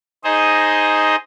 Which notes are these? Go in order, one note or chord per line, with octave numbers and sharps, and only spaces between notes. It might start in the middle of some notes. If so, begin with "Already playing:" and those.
D#4 G#4 C5 D#5